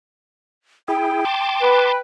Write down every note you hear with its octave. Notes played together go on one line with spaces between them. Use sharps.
E4 G#4 G5
A5 C6 D6
B4